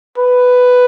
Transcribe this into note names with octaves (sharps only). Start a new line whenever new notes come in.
B4